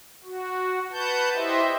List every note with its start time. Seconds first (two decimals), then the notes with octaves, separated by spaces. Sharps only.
0.24 F#4
0.91 B4 F#5 A5 G6
1.34 E4 G4 C5 D#5 E5